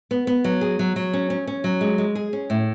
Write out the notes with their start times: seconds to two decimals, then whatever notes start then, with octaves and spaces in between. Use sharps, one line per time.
0.11 B3
0.27 B3
0.44 F#3
0.61 G#4
0.79 F#3
0.96 F#3
1.13 C#4
1.30 C#4
1.47 C#4
1.64 F#3
1.81 G#3
1.98 G#3
2.15 G#4
2.33 C#4
2.50 A2